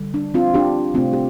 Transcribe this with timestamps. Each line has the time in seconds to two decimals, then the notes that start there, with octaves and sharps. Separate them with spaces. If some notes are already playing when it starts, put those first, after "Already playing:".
Already playing: D3 G3
0.14 D4
0.34 C4 F4
0.54 D4 G4
0.94 C3 A3 C4 F4
1.13 G4